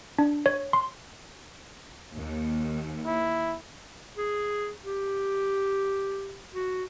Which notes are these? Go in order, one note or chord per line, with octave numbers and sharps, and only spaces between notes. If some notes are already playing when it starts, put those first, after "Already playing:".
D4
C#5
C6
D#2
E4
G#4
G4
F#4